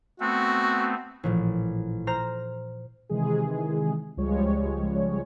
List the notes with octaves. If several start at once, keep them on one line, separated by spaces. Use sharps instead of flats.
A3 B3 C4 F#4
A1 A#2 F3
C5 A#5 F6 A#6
C3 D#3 E3 G#3 G#4
C#2 F3 G3 G#3 C#5